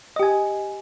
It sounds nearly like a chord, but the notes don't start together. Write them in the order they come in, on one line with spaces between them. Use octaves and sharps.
D#5 G4 G#5